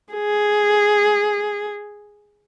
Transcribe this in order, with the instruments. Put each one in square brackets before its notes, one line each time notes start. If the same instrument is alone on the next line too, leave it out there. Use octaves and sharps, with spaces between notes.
[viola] G#4